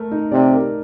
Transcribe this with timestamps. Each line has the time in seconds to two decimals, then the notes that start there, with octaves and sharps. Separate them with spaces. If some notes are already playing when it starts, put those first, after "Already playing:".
Already playing: A3 A#4
0.12 D#4
0.31 C3 D5
0.52 A#4